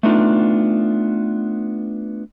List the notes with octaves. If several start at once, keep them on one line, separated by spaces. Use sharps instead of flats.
A3 B3 D4 D#4 F4